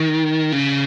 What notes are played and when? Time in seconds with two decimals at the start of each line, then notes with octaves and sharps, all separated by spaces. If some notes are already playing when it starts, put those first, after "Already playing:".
Already playing: D#3
0.52 C#3